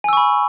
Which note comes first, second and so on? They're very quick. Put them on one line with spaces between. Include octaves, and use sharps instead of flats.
G#5 E6 C#6 B5